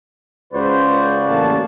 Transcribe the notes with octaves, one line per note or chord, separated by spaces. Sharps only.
C#2 C#3 F#4 B4 C5 D5
A1 A#3 A5